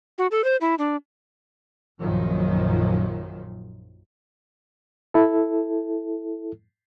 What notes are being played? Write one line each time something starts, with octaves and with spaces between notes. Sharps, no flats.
F#4
A4
C5
E4
D4
A#1 F#2 D#3 F3
E4 A4